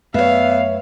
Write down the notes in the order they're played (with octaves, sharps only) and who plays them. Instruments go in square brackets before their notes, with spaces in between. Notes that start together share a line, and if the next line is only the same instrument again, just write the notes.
[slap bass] F#2 A3 [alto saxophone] B3 [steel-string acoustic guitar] C#5 E5 [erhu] F5